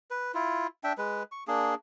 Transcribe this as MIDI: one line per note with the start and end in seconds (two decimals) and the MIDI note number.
0.11 0.32 71
0.34 0.67 64
0.34 0.67 65
0.84 0.93 62
0.84 0.93 76
0.84 0.93 79
0.98 1.23 56
0.98 1.23 71
1.32 1.44 85
1.48 1.75 58
1.48 1.75 62
1.48 1.75 68